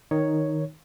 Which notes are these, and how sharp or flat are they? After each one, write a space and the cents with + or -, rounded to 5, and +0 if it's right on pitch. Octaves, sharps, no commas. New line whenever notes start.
D#3 +0 D#4 -5 C#5 +0